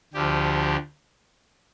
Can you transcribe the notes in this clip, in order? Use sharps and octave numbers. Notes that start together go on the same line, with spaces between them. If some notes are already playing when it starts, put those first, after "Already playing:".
D2 D3 F3 G4